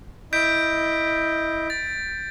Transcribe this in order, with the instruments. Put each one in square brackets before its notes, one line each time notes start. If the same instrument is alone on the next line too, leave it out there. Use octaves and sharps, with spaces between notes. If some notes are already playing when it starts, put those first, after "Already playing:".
[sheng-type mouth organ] E4 D#5 [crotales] G6 B6 D7
[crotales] A6